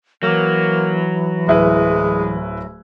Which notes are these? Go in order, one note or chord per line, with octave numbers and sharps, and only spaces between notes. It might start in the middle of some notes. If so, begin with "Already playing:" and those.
E3 F#3 A#3
D1 G#3 E4 B4